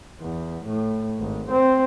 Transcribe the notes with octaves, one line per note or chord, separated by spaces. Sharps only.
E2
A2
G#1
C4